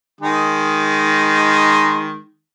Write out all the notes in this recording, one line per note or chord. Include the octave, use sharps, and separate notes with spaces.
D#3 G#3 D#4